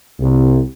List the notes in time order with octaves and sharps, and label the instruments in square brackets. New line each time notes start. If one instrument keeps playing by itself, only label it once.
[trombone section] C2